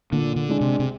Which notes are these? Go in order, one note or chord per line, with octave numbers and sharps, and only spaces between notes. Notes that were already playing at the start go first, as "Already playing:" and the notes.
A#2 D3
D3
G#3 D4
C3
C3